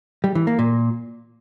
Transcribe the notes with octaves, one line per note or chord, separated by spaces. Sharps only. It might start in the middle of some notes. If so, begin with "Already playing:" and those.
G3
E3
A#3
A#2